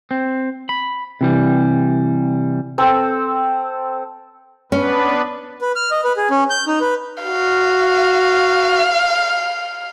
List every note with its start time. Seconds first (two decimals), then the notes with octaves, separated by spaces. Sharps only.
0.11 C4
0.69 B5
1.21 C3 E3 G3
2.78 C4 A4
4.72 B3 C#4 D4 B4
5.61 B4
5.76 F6
5.91 D#5
6.04 B4
6.17 G#4
6.30 C#4
6.50 G6
6.67 D#4
6.81 B4
7.23 F#4 F5